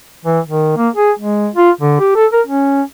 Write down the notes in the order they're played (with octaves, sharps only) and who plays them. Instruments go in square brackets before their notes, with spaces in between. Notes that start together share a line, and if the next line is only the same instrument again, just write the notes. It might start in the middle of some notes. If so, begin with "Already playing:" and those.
[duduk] E3
D#3
A#3
G#4
G#3
F4
D3
G4
A4
A#4
C#4